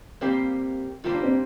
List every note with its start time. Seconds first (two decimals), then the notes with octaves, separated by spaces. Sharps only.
0.21 A#2 G3 A#3 C4 G4 C5
1.04 A#2 G3 A#3 F4 G4 C5
1.14 D4
1.23 C4